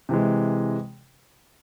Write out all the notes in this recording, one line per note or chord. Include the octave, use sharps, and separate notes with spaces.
C3 E3 G#3